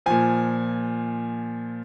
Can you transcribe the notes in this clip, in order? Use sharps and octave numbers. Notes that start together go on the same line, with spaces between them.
A#2 F3 G#5